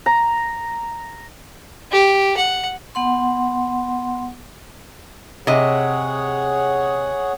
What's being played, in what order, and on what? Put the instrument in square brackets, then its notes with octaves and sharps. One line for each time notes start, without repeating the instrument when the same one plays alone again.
[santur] A#5
[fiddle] G4
F#5
[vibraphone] B3 F#5 C6
[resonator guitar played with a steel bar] C3 D#5 [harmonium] G#4 C#5 F#5